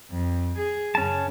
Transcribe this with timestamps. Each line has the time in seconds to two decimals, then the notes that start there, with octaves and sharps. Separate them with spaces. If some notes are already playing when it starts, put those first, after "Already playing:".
0.11 F2
0.58 G#4
0.95 F#2 C#3 C#4 A5